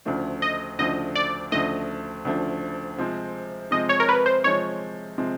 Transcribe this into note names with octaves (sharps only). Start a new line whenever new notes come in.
D2 C#3 F3 A3 D4
D#5
D2 C#3 F3 A3 D4 D#5
D5
D2 C#3 F3 A3 D4 D#5
D2 C#3 F3 A3 D4
C3 F3 G#3 C4
C3 F3 G#3 C4 D#5
C#5
A#4
B4
C5
C3 F3 G#3 C4 C#5
C3 F3 G#3 C4